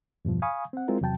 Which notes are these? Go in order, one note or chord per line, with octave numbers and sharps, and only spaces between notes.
E2 G2 B2 F3
F5 G#5 B5 C#6 D#6
C4 F#5
G#3 C4 E4 F4 A#4
E2 C3 F#3 G5 A5